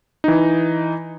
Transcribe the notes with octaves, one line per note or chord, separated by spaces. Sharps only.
E3 D#4